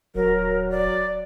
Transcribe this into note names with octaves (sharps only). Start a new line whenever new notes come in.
D#1 F#3 A#4
D5